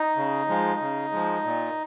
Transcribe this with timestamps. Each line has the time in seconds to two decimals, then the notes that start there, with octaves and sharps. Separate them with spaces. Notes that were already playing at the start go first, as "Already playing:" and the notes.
Already playing: D#4
0.17 C#3
0.49 F3 G#3
0.80 C#3
1.12 F3 G#3
1.44 A#2